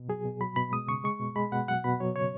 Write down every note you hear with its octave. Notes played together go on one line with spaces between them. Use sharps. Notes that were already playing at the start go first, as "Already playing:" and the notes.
Already playing: B2
F#3 G#4
B2
F#3 B5
B2 B5
G#3 D#6
C#3 C#6
G#3 C#6
B2
G#3 B5
B2 F#5
F#3 F#5
B2 B5
F#3 C#5
C#3 C#5